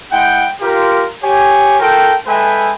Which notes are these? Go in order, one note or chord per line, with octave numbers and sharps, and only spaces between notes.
G#3 E4 F#5 G5
F4 G4 A#4
G4 C#5 G#5
F4 A4 A#4 G5
G#3 A4 B4 E5 G5 G#5